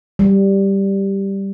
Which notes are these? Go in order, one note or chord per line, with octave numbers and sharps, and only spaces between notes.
G3